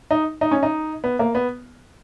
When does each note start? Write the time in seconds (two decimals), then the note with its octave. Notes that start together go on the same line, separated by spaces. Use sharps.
0.11 D#4
0.41 D#4
0.51 C#4
0.63 D#4
1.04 B3
1.19 A#3
1.35 B3